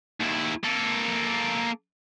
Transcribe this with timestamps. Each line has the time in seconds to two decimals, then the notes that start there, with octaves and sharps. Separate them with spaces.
0.20 D#2 E4
0.64 A#3 A4